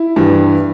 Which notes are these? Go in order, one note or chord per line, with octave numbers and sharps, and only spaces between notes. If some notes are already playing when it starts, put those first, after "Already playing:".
Already playing: E4
G2 E3